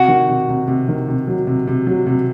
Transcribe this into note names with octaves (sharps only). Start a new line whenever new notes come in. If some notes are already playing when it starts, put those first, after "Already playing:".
Already playing: C3 F#4
D#3
C3
C3
C3
D#3
C3
F#3
C3
C3
F#3
C3